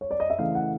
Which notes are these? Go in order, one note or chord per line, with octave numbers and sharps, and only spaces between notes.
C#5
D5
D#5
E5
C#3 E3 A3 F5
F#5